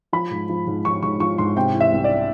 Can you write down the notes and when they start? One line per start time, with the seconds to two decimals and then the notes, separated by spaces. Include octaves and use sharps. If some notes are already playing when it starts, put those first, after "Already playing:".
0.13 F3 B5
0.31 G#2
0.49 F3
0.67 G#2
0.85 F3 C#6
1.03 G#2 C#6
1.20 F3 C#6
1.38 G#2 C6
1.56 C3 G5
1.74 E3
1.80 E5
1.92 C2
2.04 D5